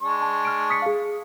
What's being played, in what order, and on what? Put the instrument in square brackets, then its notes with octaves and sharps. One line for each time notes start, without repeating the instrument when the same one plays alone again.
[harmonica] G#3 D4 C#6
[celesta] A5
F6 D7
D#6 B6 C#7
G#4 F5